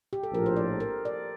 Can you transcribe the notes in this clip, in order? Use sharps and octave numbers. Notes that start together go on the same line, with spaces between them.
G4
A4
A#1 A2 F3 A#4
C5
D5
A#4
D5